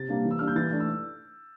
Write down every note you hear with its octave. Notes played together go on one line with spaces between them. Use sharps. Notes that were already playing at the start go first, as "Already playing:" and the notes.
Already playing: C3 A6
G3 A#3 D4
E3
E6
G3 A#3 D4 F6
G6
E3 A6
A3 D4
E6